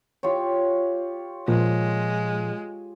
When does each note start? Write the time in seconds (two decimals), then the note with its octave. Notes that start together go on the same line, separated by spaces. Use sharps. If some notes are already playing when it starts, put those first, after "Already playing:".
0.23 F4 G4 C#5
1.48 A#2 F3 G#3